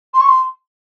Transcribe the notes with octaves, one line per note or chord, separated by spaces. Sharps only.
C6
C#6
C6